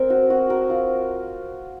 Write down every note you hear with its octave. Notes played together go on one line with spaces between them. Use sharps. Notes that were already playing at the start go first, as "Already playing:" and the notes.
Already playing: C4 A#4
F#4
F#4
A#4
F4